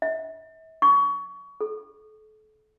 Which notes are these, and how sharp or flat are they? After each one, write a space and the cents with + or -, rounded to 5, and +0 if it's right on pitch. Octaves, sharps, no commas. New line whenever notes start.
E5 -40
C#6 +25
A4 -35